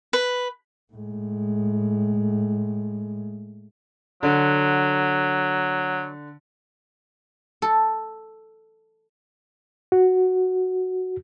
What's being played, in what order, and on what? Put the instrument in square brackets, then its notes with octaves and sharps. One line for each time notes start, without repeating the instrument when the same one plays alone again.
[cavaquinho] B4
[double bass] A2 G#3
[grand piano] D3 [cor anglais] F#3
[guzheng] A4
[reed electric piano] F#4